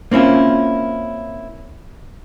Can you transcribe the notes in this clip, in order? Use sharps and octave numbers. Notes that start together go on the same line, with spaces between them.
A#3 C4 C#4 E4 F4